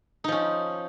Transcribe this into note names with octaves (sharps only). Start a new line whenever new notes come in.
F3 C#4 D#4